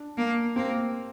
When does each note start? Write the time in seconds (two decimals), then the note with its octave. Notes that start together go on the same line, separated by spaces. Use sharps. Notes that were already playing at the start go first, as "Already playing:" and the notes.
Already playing: D4
0.17 A#3
0.56 A#3 C4